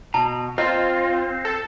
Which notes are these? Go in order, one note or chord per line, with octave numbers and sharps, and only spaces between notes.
B2 A5
C4 F4 D#5
A4